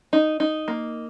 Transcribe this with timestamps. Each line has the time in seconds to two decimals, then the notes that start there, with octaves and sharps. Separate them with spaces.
0.13 D#4
0.40 D#4
0.68 A#3